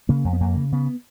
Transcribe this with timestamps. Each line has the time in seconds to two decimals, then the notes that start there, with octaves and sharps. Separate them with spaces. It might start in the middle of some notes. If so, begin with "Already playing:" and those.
0.09 C#3 A#3
0.25 F2
0.33 B3
0.41 F2 A#3
0.56 C#3
0.72 C#3 B3